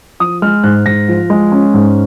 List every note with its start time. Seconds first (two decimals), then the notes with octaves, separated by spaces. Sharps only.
0.20 F3 D#6
0.42 G#3 F6
0.64 G#2 F#6
0.86 G#2 A#6
1.08 F3
1.30 G#3
1.52 C#4
1.74 G#2